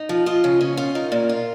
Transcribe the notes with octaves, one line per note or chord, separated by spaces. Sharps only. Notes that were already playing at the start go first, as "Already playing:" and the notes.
Already playing: D#4
F3
F4 D#5
C#3
C#4
F4
D#4 A#4
A#2
F4